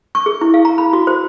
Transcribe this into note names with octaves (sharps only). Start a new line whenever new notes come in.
C#6
G#4
E4
F5
A#5
B5
F#4
C5